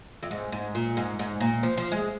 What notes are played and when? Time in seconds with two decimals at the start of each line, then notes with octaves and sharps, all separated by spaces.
0.23 F2
0.31 G#2
0.52 G#2
0.75 A#2
0.97 G#2
1.19 G#2
1.40 A#2
1.63 F3
1.77 F3
1.92 G#3